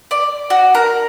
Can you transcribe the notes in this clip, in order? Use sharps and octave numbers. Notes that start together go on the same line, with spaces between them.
D5
F#4
A#4